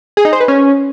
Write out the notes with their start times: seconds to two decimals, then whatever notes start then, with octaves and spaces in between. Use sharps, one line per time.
0.17 G#4
0.25 D#4
0.33 C5
0.40 B4
0.48 C#4